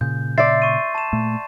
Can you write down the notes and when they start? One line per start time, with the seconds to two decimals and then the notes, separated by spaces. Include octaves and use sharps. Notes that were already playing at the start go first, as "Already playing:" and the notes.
0.01 A#2 C#3 G6
0.38 D5 E5 C6 A6 C7
0.62 C#6 D#7
0.95 A5 E7
1.13 A#2 A3